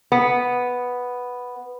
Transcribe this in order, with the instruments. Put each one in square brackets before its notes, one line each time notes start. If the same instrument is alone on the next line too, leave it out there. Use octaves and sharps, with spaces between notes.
[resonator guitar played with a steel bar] B3